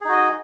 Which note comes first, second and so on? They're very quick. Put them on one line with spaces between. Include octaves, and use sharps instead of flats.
G#4 D#4 F#4 D#5